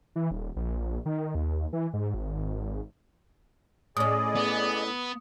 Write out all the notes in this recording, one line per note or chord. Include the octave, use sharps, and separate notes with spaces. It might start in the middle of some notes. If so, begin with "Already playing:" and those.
E3
D#1
A#1
D#3
D#2
E3
G#2
G#1
A2 C#4 G#4 D5 D#5 D#6
B3